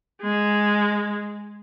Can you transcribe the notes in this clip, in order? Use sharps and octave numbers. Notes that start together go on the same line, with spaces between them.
G#3